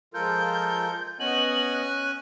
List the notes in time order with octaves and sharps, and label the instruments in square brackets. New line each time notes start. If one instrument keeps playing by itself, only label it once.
[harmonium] F3 G#3 [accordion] F4 A4 A#4 [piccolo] G6
[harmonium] B3 D#5 F#5 [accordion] C#4 G#5 [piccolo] F#7
[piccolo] F#6